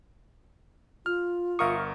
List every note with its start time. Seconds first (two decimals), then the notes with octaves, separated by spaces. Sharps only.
1.06 F4 F6
1.59 G1 A#4 E5 F5 C#6 D#6